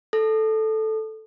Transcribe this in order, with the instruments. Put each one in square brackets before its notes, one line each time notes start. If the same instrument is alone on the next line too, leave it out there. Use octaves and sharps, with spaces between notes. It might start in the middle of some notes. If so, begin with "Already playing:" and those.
[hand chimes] A4